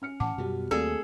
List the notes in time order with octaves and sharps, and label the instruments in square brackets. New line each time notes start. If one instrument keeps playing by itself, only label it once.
[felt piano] C#4 F6 C#7
[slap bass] A2 E3 [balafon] F#5 A5 D6
[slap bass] F#2 B2 B3 [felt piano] G3 F#4
[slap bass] D#2 A#3 [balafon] A3 C4 D5 [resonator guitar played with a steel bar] G#4 A4